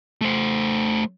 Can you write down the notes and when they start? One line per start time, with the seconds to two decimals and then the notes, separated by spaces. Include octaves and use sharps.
0.21 A3 C5